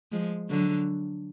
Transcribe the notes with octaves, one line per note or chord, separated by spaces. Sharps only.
F3 G#3
D3 F#3